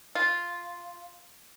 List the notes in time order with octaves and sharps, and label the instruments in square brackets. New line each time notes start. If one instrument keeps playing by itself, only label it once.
[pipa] F4